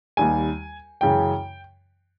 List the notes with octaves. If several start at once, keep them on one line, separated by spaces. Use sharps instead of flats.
D#2 D#3 G3 G#5
F#2 C#3 E3 G#3 G5